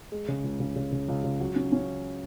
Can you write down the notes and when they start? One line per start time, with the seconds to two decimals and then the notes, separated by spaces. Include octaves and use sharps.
0.12 G#3
0.28 C#3
0.44 C#2
0.60 C#3
0.76 C#3
0.92 C#3
1.08 C#2
1.24 C#3
1.40 F#3
1.56 C#4
1.72 C#4